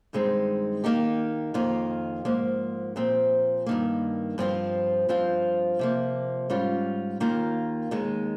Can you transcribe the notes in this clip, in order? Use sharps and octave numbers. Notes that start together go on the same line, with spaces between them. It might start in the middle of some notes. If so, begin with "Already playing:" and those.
G2 D#3 G#3 C4 D#4
D#3 A#3 D#4 G4
F2 D#3 A#3 F4
G#2 F3 A#3
A#2 F3 C4
G2 D#3 A#3
G2 F3 C4 F4
G2 F3 C4 F4
C3 F3 A#3
G#2 G3 C#4 F4
D#2 D#3 A#3 F4
D#2 D#3 G#3